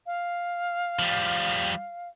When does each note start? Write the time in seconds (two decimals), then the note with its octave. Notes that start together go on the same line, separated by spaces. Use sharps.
0.06 F5
0.99 F3 G3